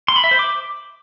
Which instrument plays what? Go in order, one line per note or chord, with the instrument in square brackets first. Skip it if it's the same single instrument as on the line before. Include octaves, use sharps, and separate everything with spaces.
[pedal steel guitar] C6
B5
E5
C5
D6